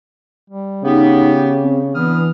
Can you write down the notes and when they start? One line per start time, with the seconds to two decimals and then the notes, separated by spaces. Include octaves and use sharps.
0.50 G3
0.84 C#3 B3 D#4 G4
1.61 C4
1.94 E3 B3 D4 D#6 F6